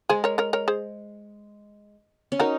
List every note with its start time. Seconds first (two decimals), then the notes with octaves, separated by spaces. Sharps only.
0.09 G#3 G#4 C5
0.24 A#4 C#5
0.38 A#4 C#5
0.53 A#4 C#5
0.68 G#4 C5
2.32 C#4
2.40 D#4 F#4 A#4